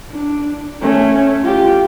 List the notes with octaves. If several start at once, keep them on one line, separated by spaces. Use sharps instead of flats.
D4
A3 C#4
F4 G4